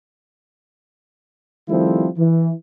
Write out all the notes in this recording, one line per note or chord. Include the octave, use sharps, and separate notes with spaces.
D#3 F3 G3 A3 C4 E4
E3